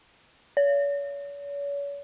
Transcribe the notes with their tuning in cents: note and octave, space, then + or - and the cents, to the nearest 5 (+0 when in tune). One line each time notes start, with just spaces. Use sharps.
C#5 +40